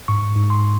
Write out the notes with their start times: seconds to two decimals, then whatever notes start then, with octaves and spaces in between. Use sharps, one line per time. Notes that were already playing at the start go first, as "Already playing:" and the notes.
0.08 G#2 C#6
0.36 G#2
0.50 C6